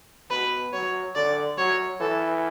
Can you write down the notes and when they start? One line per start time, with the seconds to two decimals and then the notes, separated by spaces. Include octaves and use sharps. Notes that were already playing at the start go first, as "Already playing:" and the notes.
0.31 B2 B4
0.73 F#3 C#5
1.16 D3 D5
1.58 F#3 C#5
2.01 E3 A4